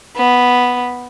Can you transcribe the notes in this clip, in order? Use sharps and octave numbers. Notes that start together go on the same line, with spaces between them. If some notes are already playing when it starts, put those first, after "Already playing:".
B3